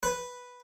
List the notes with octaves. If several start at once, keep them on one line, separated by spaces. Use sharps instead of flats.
B4